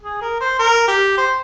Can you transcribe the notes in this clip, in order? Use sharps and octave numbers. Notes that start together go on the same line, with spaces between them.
G#4
A#4
C5
A#4
G4
C5